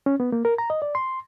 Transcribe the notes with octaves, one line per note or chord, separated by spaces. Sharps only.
C#4
B3
A#3
A#4
A#5
D#5
D5
C6